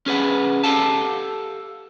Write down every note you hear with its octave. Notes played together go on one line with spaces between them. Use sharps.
C#4 G#4 B4 F#5
G4 A4 F5 F#5 A5